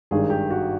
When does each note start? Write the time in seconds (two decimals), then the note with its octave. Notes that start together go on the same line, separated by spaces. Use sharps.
0.11 G#1 G2 D#3 G#4
0.30 G4
0.51 F#4